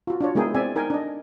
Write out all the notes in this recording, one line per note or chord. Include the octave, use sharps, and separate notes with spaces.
F4 F#4
D4 F4 C#5
G#3 B3 E4 G#4 A#4 G5
C4 D5 E5 G#5
D#4 A#4 G5 G#5
D4 D#5